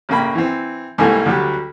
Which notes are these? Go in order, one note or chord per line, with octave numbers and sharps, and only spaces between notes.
A1 C#3 A#3 G5 B5
E3 C4
C2 G#2 E3 A3 A#3 G#5
D2 F#3 G3 G4